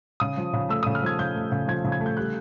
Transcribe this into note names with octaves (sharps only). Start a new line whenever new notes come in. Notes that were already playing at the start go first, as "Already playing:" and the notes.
C#3 D#6
F3
C#3
A3 E6
C#3 D#6
F6
F3 G#6
C#3 G6
A3
C#3
F3 G#6
C#3
G#6
A3
G6
G3 F#6